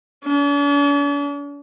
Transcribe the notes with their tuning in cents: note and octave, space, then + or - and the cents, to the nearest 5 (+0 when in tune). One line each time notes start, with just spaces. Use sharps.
D4 -45